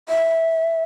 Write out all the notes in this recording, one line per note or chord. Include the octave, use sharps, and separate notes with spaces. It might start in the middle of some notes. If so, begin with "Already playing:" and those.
E5